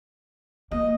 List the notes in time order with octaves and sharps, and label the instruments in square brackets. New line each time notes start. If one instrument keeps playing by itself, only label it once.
[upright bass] A#3 [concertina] D#5